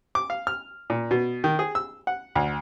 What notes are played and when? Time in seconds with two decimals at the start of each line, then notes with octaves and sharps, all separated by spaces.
0.15 D6
0.30 F5
0.47 F6
0.90 A#2
1.11 B2
1.44 D#3
1.59 G#4
1.75 E6
2.07 F#5
2.35 D2